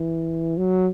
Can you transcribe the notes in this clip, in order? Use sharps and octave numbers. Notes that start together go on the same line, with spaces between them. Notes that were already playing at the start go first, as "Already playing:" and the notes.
Already playing: E3
F#3